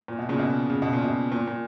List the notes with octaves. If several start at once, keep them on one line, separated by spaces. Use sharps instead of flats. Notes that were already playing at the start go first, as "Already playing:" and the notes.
A#2
B2
A#2 C#3
B2
C#3
B2
A#2
B2
A#2
A#2